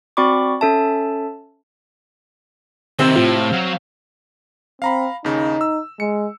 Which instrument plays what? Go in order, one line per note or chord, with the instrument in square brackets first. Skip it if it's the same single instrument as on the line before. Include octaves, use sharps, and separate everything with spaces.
[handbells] C4 F#4 D5 B5 C#6 D6
C#4 A4 E5 A5
[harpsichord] C3 [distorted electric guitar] D#3 E5 [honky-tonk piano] C4
[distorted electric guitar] A2 [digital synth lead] F4
[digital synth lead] F5
[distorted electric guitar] F#3
[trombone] C4 [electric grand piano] F5 A#5 B5
[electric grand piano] D#2 C#3 [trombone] D#4
[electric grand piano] E6
[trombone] G#3 [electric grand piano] C#7